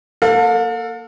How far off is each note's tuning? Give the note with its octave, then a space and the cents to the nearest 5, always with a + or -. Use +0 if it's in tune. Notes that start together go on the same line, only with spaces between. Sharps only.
A#3 +0 A4 +30 F5 +40